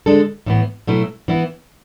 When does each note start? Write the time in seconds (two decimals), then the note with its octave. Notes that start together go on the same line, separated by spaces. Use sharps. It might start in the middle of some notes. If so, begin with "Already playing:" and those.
0.06 D3 G#3 D4 A4
0.46 A2 E3 B3
0.87 B2 F#3 A3 E4
1.28 E3 B3 E4